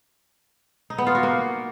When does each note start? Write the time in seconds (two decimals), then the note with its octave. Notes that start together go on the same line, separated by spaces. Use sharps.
0.90 D#4
0.98 B3
1.07 F4
1.15 F#4
1.23 A#3